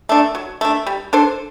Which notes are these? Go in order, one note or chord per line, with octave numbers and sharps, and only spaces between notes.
A3 D4
F#3
A3 D4
G3
D4 A4 C5